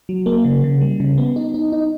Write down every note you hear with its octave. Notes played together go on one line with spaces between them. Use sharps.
F#3
A#3
C#3
C#3
G3
C#3
B3
D#4
D#4
D#4